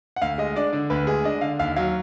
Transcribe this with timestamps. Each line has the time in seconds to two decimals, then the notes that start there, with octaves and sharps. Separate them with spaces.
0.16 F#5
0.21 D2 F5
0.38 G#3 D#5
0.56 D4 D5
0.73 D3 D5
0.90 D2 B4
1.07 G#3 G#4
1.24 D4 D#5
1.41 D3 F5
1.59 D#2 F5
1.76 F#3 F5